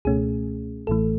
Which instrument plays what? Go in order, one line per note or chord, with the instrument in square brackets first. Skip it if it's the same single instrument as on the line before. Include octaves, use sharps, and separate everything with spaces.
[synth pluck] C#2 B2 A3 C#4 G#4
A1 A2 E3 A3 A4